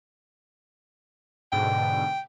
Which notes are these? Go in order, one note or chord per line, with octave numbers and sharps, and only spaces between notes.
G#2 B2 D3 G5